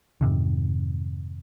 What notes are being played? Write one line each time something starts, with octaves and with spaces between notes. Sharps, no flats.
F2 G#2 C3 D#3